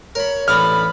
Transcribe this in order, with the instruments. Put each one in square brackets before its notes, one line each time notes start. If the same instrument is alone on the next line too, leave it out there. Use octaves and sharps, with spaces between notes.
[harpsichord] A#4 B5 [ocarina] C#5
[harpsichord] A1 D4 [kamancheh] B5 [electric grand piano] F6